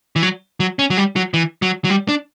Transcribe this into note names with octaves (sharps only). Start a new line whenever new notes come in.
E3
F#3
F#3
C#4
F#3
G3
F#3
E3
F#3
F#3
G3
D4